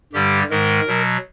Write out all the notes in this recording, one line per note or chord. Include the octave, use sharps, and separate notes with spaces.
G2 D3 G3 G4
G#2 D#3 G#3 A#4
B2 F#3